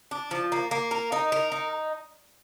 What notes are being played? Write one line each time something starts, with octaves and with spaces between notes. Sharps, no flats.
D4
F3
A#3
A#3
A#4
D#4
A#4
D#4